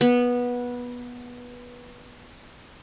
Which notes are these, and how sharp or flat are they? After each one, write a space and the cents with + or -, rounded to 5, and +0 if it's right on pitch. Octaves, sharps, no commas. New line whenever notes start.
B3 -15